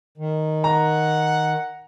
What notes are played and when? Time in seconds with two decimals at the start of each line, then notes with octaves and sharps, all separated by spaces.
0.18 D#3
0.64 F#5 A#5